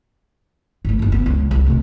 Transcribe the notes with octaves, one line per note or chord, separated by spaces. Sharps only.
G#1 D2
F#1 E4
B3
C#2
C2
D2 B2